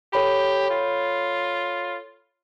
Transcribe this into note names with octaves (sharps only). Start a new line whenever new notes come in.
G4 A4 C#5 B5
F4